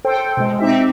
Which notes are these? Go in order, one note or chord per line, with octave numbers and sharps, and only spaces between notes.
A4 C5 G5
B2 G#3
C4 D#4 G4 E5